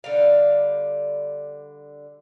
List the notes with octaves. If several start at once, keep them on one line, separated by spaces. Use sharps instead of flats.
D3 G3 F5